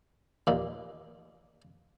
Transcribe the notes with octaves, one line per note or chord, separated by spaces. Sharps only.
D#2 A#2